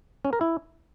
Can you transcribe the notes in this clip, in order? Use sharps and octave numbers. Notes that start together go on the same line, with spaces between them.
C#4
A#4
E4